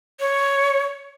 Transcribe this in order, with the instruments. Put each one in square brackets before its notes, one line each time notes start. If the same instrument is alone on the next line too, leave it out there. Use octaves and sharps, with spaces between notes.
[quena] C#5